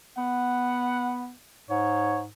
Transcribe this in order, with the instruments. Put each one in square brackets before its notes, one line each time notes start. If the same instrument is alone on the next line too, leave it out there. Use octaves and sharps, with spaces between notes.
[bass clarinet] B3 [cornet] F#5
[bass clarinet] G#2 [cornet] C#5